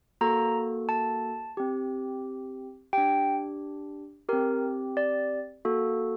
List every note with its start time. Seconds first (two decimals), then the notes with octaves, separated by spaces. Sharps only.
0.21 A#3 F#4 A4 A#5
0.89 A5
1.57 C4 G4
2.93 D4 G4 G5
4.29 C4 G4 A#4
4.97 D5
5.65 A#3 F#4 A4